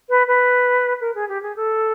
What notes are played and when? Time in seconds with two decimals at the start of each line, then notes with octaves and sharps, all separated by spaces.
0.09 B4
0.27 B4
1.01 A#4
1.14 G#4
1.28 G4
1.42 G#4
1.56 A4